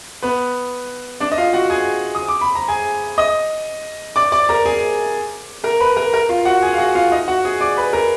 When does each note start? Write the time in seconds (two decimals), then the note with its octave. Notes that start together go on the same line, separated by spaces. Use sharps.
0.23 B3 B4
1.20 D4 D5
1.32 D#5
1.38 F4 F5
1.53 F#4 F#5
1.70 G#4 G#5
2.15 D#6
2.29 D6
2.41 B5
2.55 A#5
2.68 G#4 G#5
3.18 D#5 D#6
4.16 D5 D6
4.32 D5 D6
4.49 A#4 A#5
4.66 G#4 G#5
5.64 A#4 A#5
5.80 B4 B5
5.96 A#4 A#5
6.13 A#4 A#5
6.29 F4 F5
6.45 F#4 F#5
6.62 G#4 G#5
6.73 F5
6.78 F#4 F#5
6.95 F4 F5
7.12 D#4 D#5
7.28 F#4 F#5
7.45 G#4 G#5
7.61 D5 D6
7.77 B4 B5
7.93 A#4 A#5